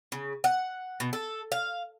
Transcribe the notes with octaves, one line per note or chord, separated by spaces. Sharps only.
C#3
F#5
B2
A4
F5